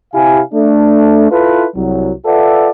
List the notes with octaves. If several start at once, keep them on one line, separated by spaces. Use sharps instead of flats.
C3 E4 G4 F5 G#5
A3 D4
E4 F4 A4 B4
C2 F#3
F4 A4 B4 D5 E5 F#5